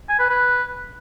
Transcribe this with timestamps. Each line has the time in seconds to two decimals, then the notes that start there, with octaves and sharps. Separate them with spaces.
0.09 G#5
0.19 B4
0.29 B4